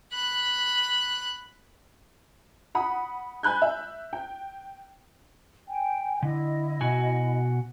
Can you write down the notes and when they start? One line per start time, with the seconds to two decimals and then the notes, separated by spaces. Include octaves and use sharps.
0.12 B5 F#6
2.75 F#5 B5 D#6
3.43 G#5 B5 F#6 G6
3.62 E5
4.13 G5
5.68 G5 G#5
6.23 D3 E4 D#5
6.81 B2 F#4 G#5